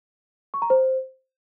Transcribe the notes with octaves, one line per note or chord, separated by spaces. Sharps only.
C#6
A#5
C5